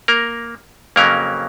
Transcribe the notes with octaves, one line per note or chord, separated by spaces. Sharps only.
A#3 A#4
F2 C#3 F#3 A#3 C#4 A#4